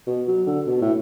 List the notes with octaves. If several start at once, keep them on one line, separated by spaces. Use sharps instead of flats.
B2
F#3
D3
B2
A2